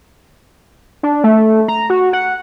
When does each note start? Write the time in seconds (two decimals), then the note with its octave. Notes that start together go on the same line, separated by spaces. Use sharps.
1.03 D4
1.24 A3
1.68 A#5
1.90 F#4
2.13 F#5